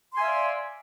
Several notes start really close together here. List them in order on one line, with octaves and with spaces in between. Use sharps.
C6 G#5 E5 F5 D5